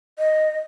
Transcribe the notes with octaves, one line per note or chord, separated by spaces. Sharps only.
D#5